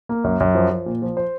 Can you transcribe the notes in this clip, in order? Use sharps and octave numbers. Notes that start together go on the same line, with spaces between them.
A#3
F#2
F#2
F3
F3
A#2
F3
C5